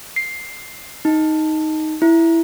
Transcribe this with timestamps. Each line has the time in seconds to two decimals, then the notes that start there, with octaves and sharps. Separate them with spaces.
0.16 C7
1.05 D#4
2.02 E4